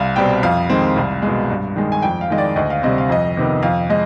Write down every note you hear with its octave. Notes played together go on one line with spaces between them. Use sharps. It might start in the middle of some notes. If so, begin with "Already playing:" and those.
Already playing: C2 F5
B2 G3 C4 G5
F2 F5
D#3 G#3 C4
C2
B2 G#3
G2
D#3 G#3
G#5
F2 G5
F5
D#3 G#3 D#5
D5
D2 D#5
F5
C3 G3 C4 D#5
F5
F2 D#5
C3 D#3 B3
F2 F5
G#3 D#5